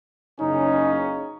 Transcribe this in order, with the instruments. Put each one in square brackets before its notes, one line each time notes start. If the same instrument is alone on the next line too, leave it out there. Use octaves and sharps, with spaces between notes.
[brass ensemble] F#1 C#3 C#4 [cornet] D#4